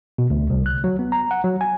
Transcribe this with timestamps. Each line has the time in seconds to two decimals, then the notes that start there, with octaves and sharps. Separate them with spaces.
0.18 B2
0.30 D2
0.50 C2
0.66 F#6
0.84 F#3
0.99 B3
1.12 A#5
1.31 F#5
1.44 F#3
1.61 G#5